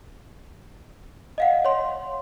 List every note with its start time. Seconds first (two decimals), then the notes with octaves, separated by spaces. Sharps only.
1.38 D#5 F5 F#5
1.65 C#5 C6